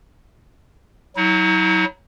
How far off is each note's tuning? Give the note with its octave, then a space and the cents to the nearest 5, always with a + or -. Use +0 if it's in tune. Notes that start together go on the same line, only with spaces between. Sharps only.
F#3 +5 E4 -45